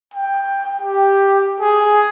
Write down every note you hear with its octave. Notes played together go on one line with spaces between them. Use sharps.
G5
G4
G#4